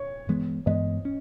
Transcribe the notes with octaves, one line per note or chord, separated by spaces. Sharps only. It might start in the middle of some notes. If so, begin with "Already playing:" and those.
Already playing: C#5
G2 E3 G#3 B3
G2 E3 G#3 B3 D#5
C#4